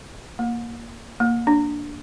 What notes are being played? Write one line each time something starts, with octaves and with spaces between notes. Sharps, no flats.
A#3
A#3
D4